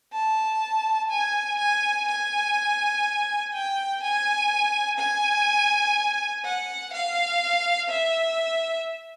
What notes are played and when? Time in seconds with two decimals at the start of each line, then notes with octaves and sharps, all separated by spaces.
0.13 A5
1.10 G#5
1.59 G#5
2.08 G#5
3.54 G5
4.02 G#5
4.99 G#5
6.45 F#5
6.93 F5
7.90 E5